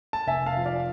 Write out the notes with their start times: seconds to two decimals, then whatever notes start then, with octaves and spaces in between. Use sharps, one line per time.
0.13 A5
0.27 F1 E5 G#5
0.46 F5 A5
0.57 F3
0.66 D5 F5